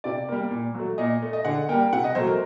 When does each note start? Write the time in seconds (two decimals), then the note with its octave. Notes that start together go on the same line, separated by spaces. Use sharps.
0.04 C3 D5
0.29 G3 A#3
0.51 A#2
0.74 F#3 A3
0.98 A#2 D#5
1.22 A3
1.33 D#5
1.45 D3 F#5
1.69 G3 A#3 G5
1.93 C3 F#5
2.04 D#5
2.15 F#3 A3 C5
2.27 A#4